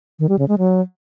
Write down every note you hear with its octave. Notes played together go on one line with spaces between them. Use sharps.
D#3
G3
C#3
G#3
F#3